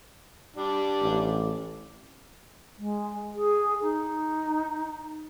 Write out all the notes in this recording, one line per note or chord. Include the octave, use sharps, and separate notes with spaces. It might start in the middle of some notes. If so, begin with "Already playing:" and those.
G3 D4
A1
G#3
G#4
D#4